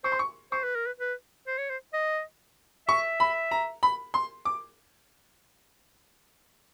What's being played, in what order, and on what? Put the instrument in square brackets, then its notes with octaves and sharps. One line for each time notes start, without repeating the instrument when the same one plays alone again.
[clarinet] C5 [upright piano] C#6
[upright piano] C6
C#6
[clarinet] C5 [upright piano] C#6
[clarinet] B4
A#4
B4
B4
C5
C#5
C5
D#5
[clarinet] E5 [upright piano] C#6
[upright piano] B5
A#5
B5
C6
D6